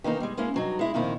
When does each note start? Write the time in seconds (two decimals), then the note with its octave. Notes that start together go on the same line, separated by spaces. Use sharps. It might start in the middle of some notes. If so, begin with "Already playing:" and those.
0.04 D#3 E3 A#3 D#4
0.20 G3 G#3
0.37 G#3 A#3 C#4 E4
0.54 G2 F#3 D#4
0.79 G#3 E4
0.94 F2 A#2 D#3 D#4 E4